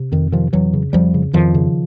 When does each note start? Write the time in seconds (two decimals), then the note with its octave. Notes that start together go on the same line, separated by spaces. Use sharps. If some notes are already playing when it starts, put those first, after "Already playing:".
Already playing: C3
0.12 F2 D#3
0.32 C3 D#3 F3
0.53 F2 E3 F#3
0.73 C#3
0.93 F2 F3 G3
1.14 C#3
1.33 F2 D#3 F3
1.54 C#3